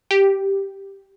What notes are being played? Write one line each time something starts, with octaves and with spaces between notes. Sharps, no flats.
G4